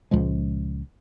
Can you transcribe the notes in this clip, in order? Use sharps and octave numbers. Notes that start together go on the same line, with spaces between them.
C#2 A#2 F3 G#3